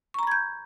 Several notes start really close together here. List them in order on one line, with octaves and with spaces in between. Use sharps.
C#6 A#5 B5 G#6 G6